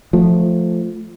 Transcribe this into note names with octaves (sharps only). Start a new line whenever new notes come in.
F3 A3